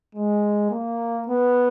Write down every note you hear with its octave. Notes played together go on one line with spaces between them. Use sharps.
G#3
A#3
B3